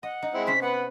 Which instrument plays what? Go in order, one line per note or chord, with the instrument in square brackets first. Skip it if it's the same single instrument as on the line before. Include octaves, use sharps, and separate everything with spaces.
[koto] D#5 [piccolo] F#5
[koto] D#4
[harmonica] G#3 C4 E4
[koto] C3 C#4 C5 [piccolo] B6
[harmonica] B3 B4 [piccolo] F#5